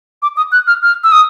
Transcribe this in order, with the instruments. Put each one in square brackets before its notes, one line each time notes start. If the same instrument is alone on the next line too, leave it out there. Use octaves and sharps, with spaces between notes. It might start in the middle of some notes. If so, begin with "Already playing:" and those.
[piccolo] D6
D#6
F#6
F6
F6
E6
D#6